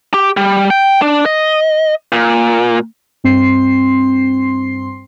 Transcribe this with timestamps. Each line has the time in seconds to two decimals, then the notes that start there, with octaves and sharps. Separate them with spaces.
0.14 G4
0.37 G3
0.70 G5
1.02 D4
1.26 D#5
2.12 A#2
3.24 G2 C4 C6 C7